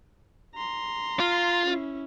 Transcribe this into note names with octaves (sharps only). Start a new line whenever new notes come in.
A#5 C6
F4
C#4 E4